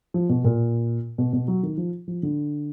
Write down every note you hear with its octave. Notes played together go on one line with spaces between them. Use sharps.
F3
B2
A#2
B2
B2
F#3
D#3
F3
F3
D3